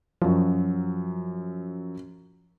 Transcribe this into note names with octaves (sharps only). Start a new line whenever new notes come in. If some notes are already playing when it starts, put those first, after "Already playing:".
F#2 F3 F#3